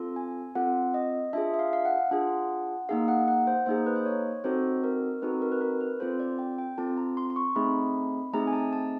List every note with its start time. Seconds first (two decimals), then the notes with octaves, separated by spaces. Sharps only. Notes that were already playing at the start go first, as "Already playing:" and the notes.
Already playing: C4 F4 A4
0.16 G#5
0.55 C4 F4 A4 F#5
0.94 D#5
1.33 D4 F4 G#4 E5
1.54 E5
1.59 F5
1.73 F5
1.85 F#5
2.11 D4 F4 G#4
2.89 A#3 D#4 G#4 F5
3.08 F#5
3.28 F#5
3.47 C5
3.66 A#3 D#4 G#4 C5
3.86 B4
3.96 C5
4.06 C#5
4.44 C4 D#4 F#4 A4 C5
4.84 A#4
5.22 C4 D#4 F#4 A4 B4
5.42 A#4
5.52 B4
5.61 A#4
5.81 B4
6.00 C4 F4 A4 C5
6.20 D5
6.39 G5
6.58 G5
6.78 C4 F4 A4 A5
6.97 A#5
7.17 C6
7.30 C6
7.36 C#6
7.55 A3 C4 D#4 G#4 B5
8.33 A3 C4 D#4 G#4 A#5
8.47 G#5
8.53 A5
8.73 A5